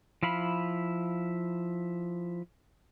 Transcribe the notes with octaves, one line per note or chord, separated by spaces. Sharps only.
F3 E4 F5 B5